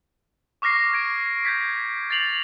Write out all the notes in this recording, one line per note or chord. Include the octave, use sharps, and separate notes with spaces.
C#6 D6 F6 A#6 C7
G#6 D7
G6 G#6 B6
A6 C7 F7 F#7